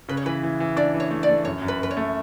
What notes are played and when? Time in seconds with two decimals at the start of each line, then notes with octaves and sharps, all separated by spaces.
0.09 C#3 B4
0.17 C#5
0.26 E3 B4
0.43 E3
0.60 E3
0.76 D4 D5
0.94 E3
1.00 C#5
1.11 A3
1.23 D5
1.29 A3
1.45 F#2 C#5
1.62 F#2
1.68 B4
1.80 F#2 B4
1.91 C#5
1.97 A3